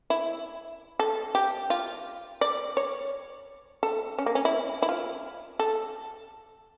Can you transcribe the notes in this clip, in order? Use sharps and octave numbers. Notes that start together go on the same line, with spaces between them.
E4
A4
G4
F4
D5
C#5
A4
C#4
A#3
C#4
E4
E4
F4
A4